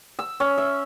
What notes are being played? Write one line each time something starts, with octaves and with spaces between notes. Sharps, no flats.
E6
C#4
E5